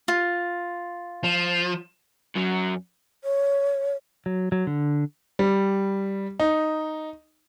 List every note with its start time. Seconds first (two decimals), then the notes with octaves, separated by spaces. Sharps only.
0.08 F4
1.24 F3
2.35 F#2 F#3
3.24 C#5
4.26 F#3
4.52 F#3
4.67 D3
5.39 G3
6.40 D#4